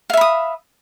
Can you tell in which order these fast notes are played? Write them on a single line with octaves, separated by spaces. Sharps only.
F5 E5 B5 D#6